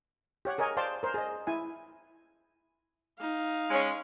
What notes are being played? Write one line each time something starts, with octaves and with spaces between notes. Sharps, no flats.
G4 C#5 F#5
G#4 A#4 C#5 D#5 G#5
C5 D5 F5 G5 A5 C6
A#4 C5
G#4 D#5
E4 G#5
D#4 F5
G#3 C#4